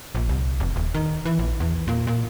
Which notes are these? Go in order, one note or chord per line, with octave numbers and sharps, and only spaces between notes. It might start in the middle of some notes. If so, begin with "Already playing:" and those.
A#1
C2
F1
D#1
D#3
E3
A#1
E2
A#2
A#2